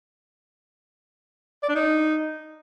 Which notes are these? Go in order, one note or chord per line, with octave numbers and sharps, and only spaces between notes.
D5
D4
D#4